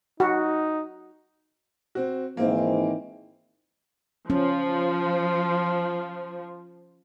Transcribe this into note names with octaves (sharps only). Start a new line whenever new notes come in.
D#4 F#4
C4 F#4
G#2 D#3 E3 A#3 C4
F3 C#4